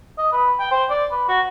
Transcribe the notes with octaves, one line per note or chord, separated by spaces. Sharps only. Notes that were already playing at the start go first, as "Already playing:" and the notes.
D#5
B4
G5
C5
D5
B4
F#4